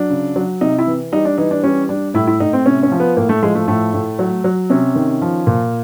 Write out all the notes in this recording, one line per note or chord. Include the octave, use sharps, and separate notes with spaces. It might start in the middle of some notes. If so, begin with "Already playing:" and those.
Already playing: F#3 D4
C#3
F#3
C3 D#4
E4
E3
G3 D#4
D4
E3 D#4
D4
G3 C#4
G3 D4
A2 E4
E4
A2 D#4
C4
C3 C#4
C#4
F3
B3
A2 A#3
A3
F3 G#3
A3
A2 A3
A2
F#3
F#3
C3 C#4
D#3
F3
A#2